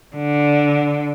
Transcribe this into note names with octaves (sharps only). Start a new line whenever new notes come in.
D3